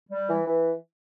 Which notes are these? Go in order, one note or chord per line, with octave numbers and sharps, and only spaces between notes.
G3
E3
E3